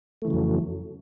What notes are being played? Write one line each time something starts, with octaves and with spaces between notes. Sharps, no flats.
F2 C#3 E3 F#3 A3